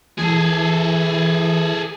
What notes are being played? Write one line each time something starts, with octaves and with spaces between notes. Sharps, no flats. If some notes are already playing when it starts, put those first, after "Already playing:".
E3 G#4 A4